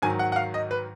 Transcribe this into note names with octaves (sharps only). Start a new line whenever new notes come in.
G#2 D#3 F#3 G#5
F#5
F#5
F5
D#5
B4